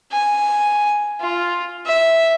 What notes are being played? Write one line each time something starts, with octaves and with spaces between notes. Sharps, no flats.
G#5
F4
E5